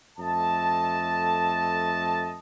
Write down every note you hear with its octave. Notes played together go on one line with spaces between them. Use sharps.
F2 A3 A4 D#5 A5